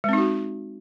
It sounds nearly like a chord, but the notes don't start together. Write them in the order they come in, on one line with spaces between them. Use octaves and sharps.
G#3 C4 D#4 F#4